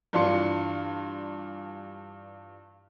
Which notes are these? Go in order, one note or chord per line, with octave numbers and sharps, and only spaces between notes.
G2 E3 D4 F4 C6 C#7